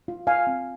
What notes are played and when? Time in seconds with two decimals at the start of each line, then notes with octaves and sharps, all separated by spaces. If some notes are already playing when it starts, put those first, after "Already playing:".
0.08 F4
0.27 F4 F5 G#5
0.47 C4